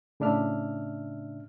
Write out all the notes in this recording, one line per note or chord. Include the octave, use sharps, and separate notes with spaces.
A2 C#3 D4 E5 F6